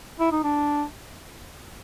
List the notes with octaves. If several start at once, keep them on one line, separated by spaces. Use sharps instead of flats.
E4
D#4
D4